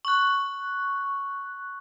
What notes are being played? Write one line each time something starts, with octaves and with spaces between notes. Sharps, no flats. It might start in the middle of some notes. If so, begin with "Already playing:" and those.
C#6 F#6